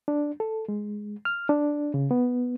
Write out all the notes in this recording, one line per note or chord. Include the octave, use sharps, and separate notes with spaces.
D4
A4
G#3
F6
D4
C#3
B3